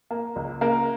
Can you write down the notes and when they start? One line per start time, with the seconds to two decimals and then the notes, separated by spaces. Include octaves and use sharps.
0.11 A#3
0.36 C#2
0.61 C#3 A#3 A#4